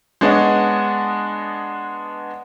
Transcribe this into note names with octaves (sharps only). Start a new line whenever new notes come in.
G#3 B3 D4 C#5 D#5 F#5